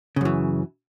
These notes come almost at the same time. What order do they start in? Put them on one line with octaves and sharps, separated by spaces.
C#3 F#2 E3